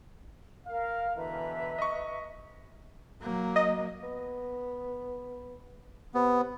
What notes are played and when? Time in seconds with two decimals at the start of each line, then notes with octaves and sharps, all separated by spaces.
0.67 A#4 F5
1.16 B2 D3 E3 B4 E5 A#5
1.78 D#5 C#6
3.21 F#3 A#3
3.56 D#5
4.03 B3
6.15 C3 B3